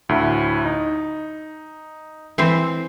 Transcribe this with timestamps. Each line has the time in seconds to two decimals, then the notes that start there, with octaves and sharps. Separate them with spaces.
0.09 D2 A2
0.65 D#4
2.38 E3 C4 C5